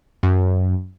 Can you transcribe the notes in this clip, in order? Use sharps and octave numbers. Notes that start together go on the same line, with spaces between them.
F#2